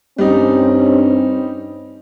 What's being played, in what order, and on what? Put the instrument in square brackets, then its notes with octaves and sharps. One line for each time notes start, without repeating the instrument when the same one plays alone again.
[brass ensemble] G2 C4 C#4 [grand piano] G3 D#4